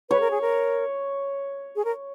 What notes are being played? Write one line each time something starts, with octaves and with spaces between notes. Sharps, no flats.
B4 C#5
A#4
G#4
A#4
G#4
A#4